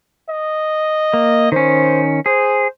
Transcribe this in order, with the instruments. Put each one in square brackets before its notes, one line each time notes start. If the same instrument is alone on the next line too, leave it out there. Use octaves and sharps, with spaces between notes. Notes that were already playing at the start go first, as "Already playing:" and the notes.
[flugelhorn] D#5
[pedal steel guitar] A#3
[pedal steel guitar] D#3 C#4 [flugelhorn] C5
[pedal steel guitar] G#4 [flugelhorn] C5